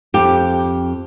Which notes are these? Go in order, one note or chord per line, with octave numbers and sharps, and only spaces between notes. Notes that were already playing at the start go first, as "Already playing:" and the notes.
F2 G4